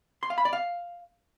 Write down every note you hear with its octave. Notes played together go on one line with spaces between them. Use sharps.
C6
F5
B5
D5
F5